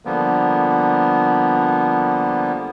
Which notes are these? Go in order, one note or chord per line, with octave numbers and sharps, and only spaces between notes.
D3 F3 G3 A#3 B3